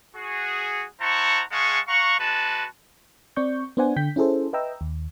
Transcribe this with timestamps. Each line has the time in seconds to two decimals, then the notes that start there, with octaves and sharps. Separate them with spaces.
0.16 F#4 G#4
1.01 E4 C5 F#5 A5 A#5 C#6
1.52 G#3 G#4 F5 F#5 A5 C#6
1.88 F5 F#5 A#5 C#6
2.20 G#3 F#4 B4 A5
3.36 C4 D5 C#6 G6
3.77 B3 D4 C5 D5 F#5 G#5
3.96 D3 G5 G6 B6
4.16 C#4 E4 G#4 A4 C5
4.53 B4 D#5 E5 G5 A#5 E6
4.81 D#2